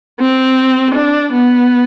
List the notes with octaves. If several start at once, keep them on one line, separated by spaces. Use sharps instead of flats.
C4
D4
B3